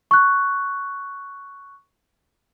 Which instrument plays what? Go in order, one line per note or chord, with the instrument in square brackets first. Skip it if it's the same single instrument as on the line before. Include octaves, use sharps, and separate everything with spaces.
[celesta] C#6 F#6